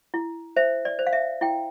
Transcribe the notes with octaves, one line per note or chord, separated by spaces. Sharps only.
E4
C5 E5
D5
C5
F5
E5
E4 G5